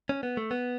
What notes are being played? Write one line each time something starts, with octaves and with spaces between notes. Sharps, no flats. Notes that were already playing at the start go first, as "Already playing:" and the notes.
C#4
B3
A3
B3